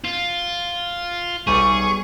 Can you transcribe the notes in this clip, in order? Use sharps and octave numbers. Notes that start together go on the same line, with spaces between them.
F4
B1 G3 G#4 C#6 D#7